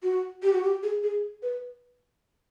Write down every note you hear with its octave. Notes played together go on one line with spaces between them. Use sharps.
F#4
G4
F#4
G4
G#4
G#4
B4